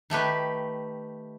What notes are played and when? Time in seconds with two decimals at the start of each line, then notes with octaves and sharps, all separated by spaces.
0.10 D#3 A3 G4 B4